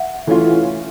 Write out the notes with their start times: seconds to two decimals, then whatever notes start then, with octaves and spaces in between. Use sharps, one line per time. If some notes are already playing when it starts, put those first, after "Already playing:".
Already playing: E5 F#5
0.27 E3 A3 C#4 F4